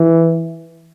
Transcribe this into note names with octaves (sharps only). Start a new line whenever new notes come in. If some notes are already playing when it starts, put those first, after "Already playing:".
Already playing: E3